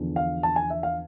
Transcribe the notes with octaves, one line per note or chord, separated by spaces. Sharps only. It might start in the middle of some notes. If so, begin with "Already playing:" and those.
Already playing: E2 D3 F3
F5
A5
G#5
E5
F5